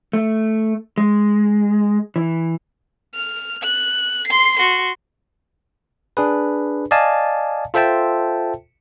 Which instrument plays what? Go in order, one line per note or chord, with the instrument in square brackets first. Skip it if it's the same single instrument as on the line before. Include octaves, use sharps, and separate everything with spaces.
[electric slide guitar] A3
G#3
E3
[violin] F6
F#6
C6 C7
F#4 C6
[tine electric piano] D4 G#4 B4
D5 D#5 F5 G#5 A5
F4 A4 C5 E5 G5 A5